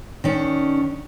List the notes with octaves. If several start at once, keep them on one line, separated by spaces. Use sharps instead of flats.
D#3 C#4 D4